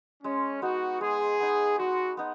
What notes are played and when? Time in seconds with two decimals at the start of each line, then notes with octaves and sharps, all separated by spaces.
0.23 G#3 C#4
0.62 B3 D#4 F#4
1.01 G#3 G#4
1.40 B3 D#4
1.79 G#3 F#4
2.17 B3 D#4